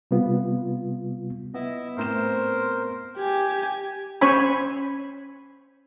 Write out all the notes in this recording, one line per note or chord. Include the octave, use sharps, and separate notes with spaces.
C3 G3 B3 F4
B3 E4 D#5 E5
A2 C4 A#4 C5 E7
G4 G#5
C#4 C5 C#5 G#5 B5